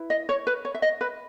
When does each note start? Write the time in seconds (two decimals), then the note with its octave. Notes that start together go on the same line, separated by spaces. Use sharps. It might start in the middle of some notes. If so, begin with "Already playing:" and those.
Already playing: E4 B4
0.10 D#5
0.29 C#5
0.47 B4
0.65 C#5
0.74 E5
0.82 D#5
1.01 B4